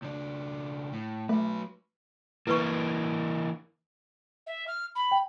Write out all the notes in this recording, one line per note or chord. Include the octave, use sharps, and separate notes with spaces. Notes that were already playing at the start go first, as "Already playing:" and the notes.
C#2 D4
A2
F#3 A3 B4
E3 A#3 E4 B4 C#6
E5
F6
B5
G5